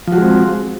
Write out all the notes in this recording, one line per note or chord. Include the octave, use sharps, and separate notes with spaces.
F3 G#3 C4 F#4